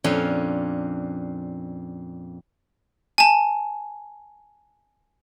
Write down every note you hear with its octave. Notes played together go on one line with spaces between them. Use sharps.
F2 A#2 C#4 D4 C#5 G#5
G#5 A5